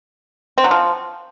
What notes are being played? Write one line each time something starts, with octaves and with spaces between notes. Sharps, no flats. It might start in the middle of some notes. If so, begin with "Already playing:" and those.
C4
F#3
F3